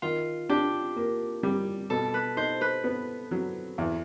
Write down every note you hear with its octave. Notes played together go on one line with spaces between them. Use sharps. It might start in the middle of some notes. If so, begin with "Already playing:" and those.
D#3 F4
D4 G4
A#3
G3
B2 A4
B4
D#4 C5
B4
B3
F#3
E2